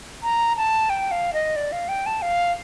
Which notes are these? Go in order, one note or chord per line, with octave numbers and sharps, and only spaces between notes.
A#5
A5
G5
F5
D#5
D5
F5
G5
A5
F5